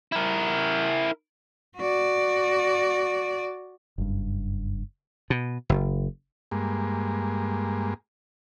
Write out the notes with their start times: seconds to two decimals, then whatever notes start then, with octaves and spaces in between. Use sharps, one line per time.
0.12 E4 A#4
1.78 F#4 D5
3.98 F#1 G2
5.30 B2
5.69 F#1
6.51 G2 G#3 A#3